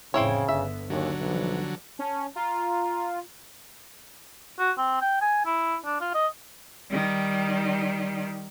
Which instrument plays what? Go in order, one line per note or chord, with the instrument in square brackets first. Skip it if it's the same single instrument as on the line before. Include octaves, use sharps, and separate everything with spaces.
[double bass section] F1 A2 E3 [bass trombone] C#3 [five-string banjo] C4 E4 C#5
[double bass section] G1 D3 B3 [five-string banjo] E5
[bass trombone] D#2 [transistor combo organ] D3 F#3 [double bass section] C#4
[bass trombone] B1 [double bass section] E3 F3 G3
[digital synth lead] C#4 [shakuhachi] A5
[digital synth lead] F4 [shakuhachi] A#5
[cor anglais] F#4
C4
G5
G#5
E4
D4
F4
D#5
[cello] D#3 G3